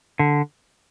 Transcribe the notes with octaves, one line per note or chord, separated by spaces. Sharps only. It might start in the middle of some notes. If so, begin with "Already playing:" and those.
D3